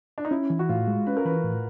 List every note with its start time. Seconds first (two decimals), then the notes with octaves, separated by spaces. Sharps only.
0.18 D4
0.25 D#4
0.31 C#4 E4
0.50 E3
0.59 F#4
0.69 A2 F4
0.88 G#3
1.07 C#4 B4
1.17 A#4
1.25 E3 B4
1.44 A2